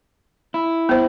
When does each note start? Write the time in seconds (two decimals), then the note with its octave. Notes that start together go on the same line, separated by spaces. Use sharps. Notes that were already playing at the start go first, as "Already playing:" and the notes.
0.54 E4
0.89 B3 C5